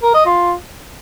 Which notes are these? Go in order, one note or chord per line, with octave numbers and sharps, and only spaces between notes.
A#4
D#5
F4